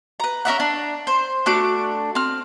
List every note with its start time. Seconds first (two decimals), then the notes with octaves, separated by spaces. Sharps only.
0.20 B4 A#5
0.45 C#4 A#4 E5 F#5
0.60 D4
1.07 C5
1.46 A3 D4 F#4 D6
2.15 C4 F6